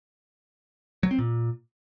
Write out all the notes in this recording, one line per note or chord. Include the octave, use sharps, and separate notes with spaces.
F#3
C4
A#2